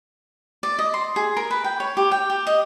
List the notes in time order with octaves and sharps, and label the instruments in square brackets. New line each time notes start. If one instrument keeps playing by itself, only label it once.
[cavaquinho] D5
D#5
C6
G#4
A#4
B4
G5
C#5
G4
G5
G4
D#5